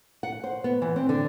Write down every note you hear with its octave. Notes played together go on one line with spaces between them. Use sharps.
F#5
C5
B3
E3
C4
D3